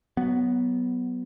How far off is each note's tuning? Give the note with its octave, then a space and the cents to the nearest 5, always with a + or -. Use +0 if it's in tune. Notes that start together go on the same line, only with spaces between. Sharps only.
F#3 +15 B3 +0